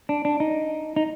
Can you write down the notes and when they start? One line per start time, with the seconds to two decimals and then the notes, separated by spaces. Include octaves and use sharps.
0.09 D4
0.25 D4
0.40 D#4
0.96 D#4